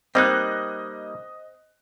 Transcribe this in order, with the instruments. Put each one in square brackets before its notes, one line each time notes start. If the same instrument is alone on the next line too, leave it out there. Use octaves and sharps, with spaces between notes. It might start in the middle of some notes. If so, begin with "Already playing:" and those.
[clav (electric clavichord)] G3 A#3 D#4 [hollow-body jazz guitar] C4 [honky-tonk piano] D#5 F#6